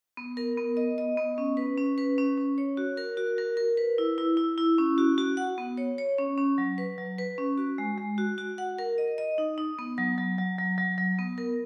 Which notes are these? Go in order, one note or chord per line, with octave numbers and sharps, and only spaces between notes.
B3
A#4
B3
D#5
D#5
B3
C#4
B4
C#4
B4
C#4
C#4
C#5
F#4
A#4
F#4
A#4
A#4
B4
E4
E4
E4
E4
C#4
F#4
F#4
F#5
B3
C#5
C#5
C#4
C#4
F#3
B4
F#3
B4
C#4
F#4
G#3
G#3
F#4
F#4
F#5
A#4
D#5
D#5
D#4
D#4
B3
F#3
F#3
F#3
F#3
F#3
F#3
B3
A#4